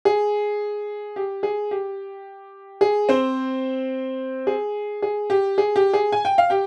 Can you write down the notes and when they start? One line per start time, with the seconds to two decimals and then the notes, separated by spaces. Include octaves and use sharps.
0.05 G#4
1.16 G4
1.43 G#4
1.71 G4
2.81 G#4
3.09 C4 C5
4.47 G#4
5.02 G#4
5.30 G4
5.58 G#4
5.76 G4
5.93 G#4
6.12 G#5
6.25 G5
6.38 F5
6.50 G4 G5